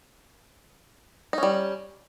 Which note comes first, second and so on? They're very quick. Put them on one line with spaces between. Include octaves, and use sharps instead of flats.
D#4 C#4 G3